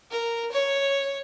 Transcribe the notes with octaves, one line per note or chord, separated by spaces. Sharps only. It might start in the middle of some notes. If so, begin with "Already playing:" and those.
A#4
C#5